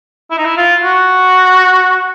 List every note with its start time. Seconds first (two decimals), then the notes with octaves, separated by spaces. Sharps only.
0.31 E4
0.38 D#4
0.45 E4
0.57 F4
0.83 F#4